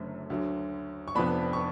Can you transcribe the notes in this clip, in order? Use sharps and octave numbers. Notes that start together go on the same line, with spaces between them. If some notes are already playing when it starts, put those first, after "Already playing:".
Already playing: F#1 F#2 D3 F#3 A3
D2 D3 F#3
C#6
F1 F2 F3 B3 D4 B5
C#6